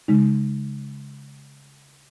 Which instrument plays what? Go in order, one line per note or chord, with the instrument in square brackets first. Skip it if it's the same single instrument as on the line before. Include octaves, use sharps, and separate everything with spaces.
[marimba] C#3 G#3 D#4